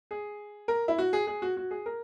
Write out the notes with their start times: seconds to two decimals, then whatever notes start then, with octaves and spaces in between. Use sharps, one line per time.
0.11 G#4
0.68 A#4
0.88 E4
0.98 F#4
1.13 G#4
1.27 G#4
1.42 F#4
1.57 F#4
1.71 G#4
1.86 A#4